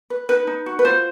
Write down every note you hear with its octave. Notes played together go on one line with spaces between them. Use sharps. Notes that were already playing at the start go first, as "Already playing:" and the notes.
B4
D#4 B4
D#4
F#4
B4
F4 C5